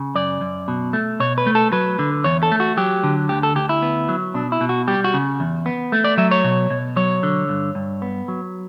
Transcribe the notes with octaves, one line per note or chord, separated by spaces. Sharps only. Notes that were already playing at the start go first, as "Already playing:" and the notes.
Already playing: C#3
F#2 D5
F#2
B2
A3
B2 C#5
B4
A3
A4
F#3 B4
D3
E2 C#5
A4
A3
F#4
F#3 G4
D3
D2 G4
A4
D2 G4
E4
B3
F#3
B2 D4
E4
B2
F#4
G3 G4
F#4
C#3
E2
B3
A3
D5
F#3 E5
C#5
B2
B2
F#3 C#5
D3
G2
G2
B3
F#3